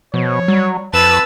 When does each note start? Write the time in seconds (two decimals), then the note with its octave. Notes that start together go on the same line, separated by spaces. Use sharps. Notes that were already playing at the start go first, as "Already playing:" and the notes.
0.14 B2 F3 C#5
0.48 F#3 G3
0.93 F2 B4 A5 E6 A6